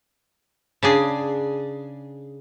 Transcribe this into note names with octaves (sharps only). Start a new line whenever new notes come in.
C#3 D4 G#4